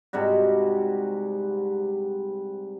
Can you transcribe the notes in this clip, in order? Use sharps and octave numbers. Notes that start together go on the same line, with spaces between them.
G#2 C3 G3 F#4